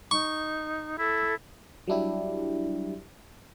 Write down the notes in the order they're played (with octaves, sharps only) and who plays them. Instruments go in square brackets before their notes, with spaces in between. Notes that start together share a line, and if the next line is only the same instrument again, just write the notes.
[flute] D#4 [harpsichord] C#6
[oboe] E4 [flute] A4
[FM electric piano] F#3 G3 D4 E4 G4